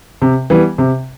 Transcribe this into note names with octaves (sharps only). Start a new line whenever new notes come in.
C3
E3 G3 B3
C3